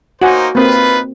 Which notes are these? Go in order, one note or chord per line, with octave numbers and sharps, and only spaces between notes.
A#3 D#4 F#4 C5 F#5 G#5
A#3 C4 D#4 F4 B4